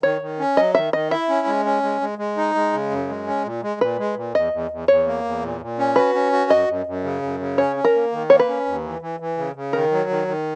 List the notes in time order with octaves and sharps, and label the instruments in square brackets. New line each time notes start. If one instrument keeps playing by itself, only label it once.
[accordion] D#3 [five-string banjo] C#5
[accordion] D#3
C#4
[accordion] F#3 [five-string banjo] D#5
[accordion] D#3 [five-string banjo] E5
[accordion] D#3 [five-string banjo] D#5
[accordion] E4 [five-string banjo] E5
[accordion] C#4
G#3
C#4
G#3
G#3
G#3
D#4
G#3
C#3
F#2
G#3
C#4
A#2
G#3
[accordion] A#2 [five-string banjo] B4
[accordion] G#3
A#2
[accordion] E2 [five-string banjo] D#5
[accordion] E2
E2
[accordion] E2 [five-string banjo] C#5
[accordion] A#3
E2
A#2
A#2
C#4
[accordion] F#4 [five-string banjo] B4
[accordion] C#4
F#4
[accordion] F#2 [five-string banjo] D#5
[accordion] F#2
F#2
C#3
F#2
C#3
[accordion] C#4 [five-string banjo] C#5
[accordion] C#4
[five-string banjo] A#4
[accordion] A#3
D#3
[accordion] A#3 [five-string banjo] C#5
[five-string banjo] B4
[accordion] C#4
D#2
E3
E3
E3
C#3
C#3
[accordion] D#3 [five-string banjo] A#4
[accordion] F#3
D#3
D#3